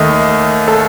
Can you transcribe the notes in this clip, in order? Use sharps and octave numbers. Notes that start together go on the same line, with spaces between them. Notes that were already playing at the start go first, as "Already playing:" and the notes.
Already playing: D#2 D#3 A3 D#5
A4